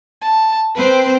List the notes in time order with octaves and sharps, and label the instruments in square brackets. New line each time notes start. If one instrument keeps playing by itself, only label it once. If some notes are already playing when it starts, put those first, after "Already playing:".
[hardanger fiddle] A5
[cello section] C4 C5 [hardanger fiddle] B4